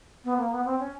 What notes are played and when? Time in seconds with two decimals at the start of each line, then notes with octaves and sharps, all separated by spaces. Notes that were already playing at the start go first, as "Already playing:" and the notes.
0.24 B3
0.37 A#3
0.51 B3
0.65 C4
0.79 C#4